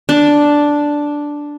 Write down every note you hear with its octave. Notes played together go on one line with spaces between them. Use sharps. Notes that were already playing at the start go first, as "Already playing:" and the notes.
D4